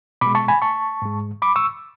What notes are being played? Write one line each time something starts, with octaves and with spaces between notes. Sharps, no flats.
B2 G#3 B5 D6
A5 C#6
G#5 B5
A5 C#6
G#2 G#3
B5 D6
C#6 E6